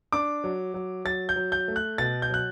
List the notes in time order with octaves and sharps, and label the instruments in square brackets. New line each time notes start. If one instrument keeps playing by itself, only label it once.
[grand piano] D4 D6
F#3
F#3
F#3 A6
G6
F#3
G6
A3
F#6
B2 A6
G6
F#3 F#6